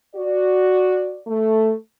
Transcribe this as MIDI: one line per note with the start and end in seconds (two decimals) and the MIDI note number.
0.16 1.20 66
0.16 1.20 74
1.27 1.73 57